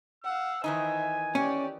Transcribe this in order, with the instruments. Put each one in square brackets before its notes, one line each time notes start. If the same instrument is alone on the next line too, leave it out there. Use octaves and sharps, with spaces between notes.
[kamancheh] F5 F#5 [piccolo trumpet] E6
[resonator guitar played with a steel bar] D#3 E3 D#4 [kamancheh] C5 E5 [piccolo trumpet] G#5
[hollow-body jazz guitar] C#4 [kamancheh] G4 D5